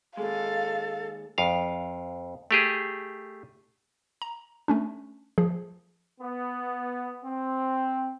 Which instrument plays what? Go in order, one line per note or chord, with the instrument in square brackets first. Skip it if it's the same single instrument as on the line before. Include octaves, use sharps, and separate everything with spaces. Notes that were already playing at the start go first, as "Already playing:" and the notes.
[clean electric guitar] D#2 G#3 [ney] A4 [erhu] F5
[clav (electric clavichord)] F2 F5
A3 G4 G#4
[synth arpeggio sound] A#5
A3 C#4 D4
F3 G#4
[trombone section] B3
C4